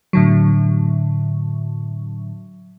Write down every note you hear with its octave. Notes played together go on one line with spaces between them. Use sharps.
A2 D3 F#3